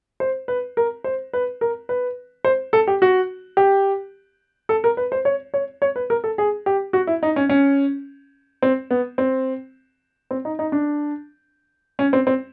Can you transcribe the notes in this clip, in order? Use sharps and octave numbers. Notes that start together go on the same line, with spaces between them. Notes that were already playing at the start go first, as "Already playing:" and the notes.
C5
B4
A#4
C5
B4
A#4
B4
C5
A4
G4
F#4
G4
A4
A#4
B4
C5
C#5
C#5
C#5
B4
A#4
A4
G#4
G4
F#4
E4
D#4
C#4
C#4
C4
B3
C4
C4
D#4
D#4
D4
C#4
C4
C4